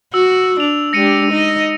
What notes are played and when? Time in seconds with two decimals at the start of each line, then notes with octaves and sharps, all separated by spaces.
0.14 F#4 E6
0.60 D4 F7
0.93 G#3 D4 G4 A#6 C#7 D#7
1.31 D#4 D#5